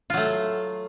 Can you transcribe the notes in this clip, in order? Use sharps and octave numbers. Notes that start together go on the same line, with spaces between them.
F#3 A3 F4